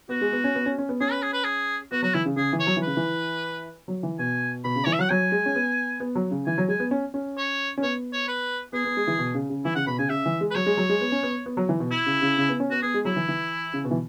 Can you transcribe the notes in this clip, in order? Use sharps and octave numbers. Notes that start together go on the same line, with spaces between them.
B3 F#4
G#3
B3
C#4
B3
C#4
C#4
B3
C#4 G#4
B4
G#4
B4
G#4
B3 F#4
F#3 F#4
E3 E4
C#3
C#3 G#4
E3
C#5
F#3
E3
C#3 B4
E3
F#3
E3
B2 G#5
B2 B5
C#3
E3 C#5
E5
F#3 F#5
F#3 G#5
G#3
C#4
B3
B3
F#3
C#3
E3 G#5
F#3
G#3 G#5
B3
C#4
C#4
C#5
C#4
B3 C#5
C#5
B4
B3 G#4
B3
G#3
E3
B2
C#3
C#3
E3 E4
C#3 F#5
B2 B5
C#3 G#5
C#3 E5
E3
G#3
B4
F#3 C#5
G#3
F#3
G#3
B3
C#4
B3
B3
F#3
E3
B2
E4
C#3
C#3
C#3
B3
C#4
B3 F#4
B3 G#4
G#3
F#3 E4
E3
E3
C#3
B2
E3